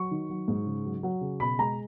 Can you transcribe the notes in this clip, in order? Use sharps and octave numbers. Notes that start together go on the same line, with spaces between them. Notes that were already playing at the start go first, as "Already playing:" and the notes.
Already playing: F#3 C#6
D#3
F#3
G#2
C#3
F#3
F#3
C#3
B2 B5
G#3 A#5